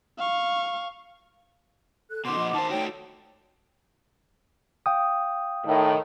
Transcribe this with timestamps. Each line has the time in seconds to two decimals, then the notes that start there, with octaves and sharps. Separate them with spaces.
0.18 F5 C#6
2.11 A4 F#6
2.25 B2 D#3 D#5 F#5 C6 D6
2.37 A#2 F3
2.54 D#3 C5 A5
2.70 A3 D#4 F#4 C#5 G5
4.86 F5 G5 D#6
5.66 A2 D#3